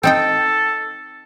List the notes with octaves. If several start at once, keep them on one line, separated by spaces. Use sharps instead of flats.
C4 D#4 A4 G5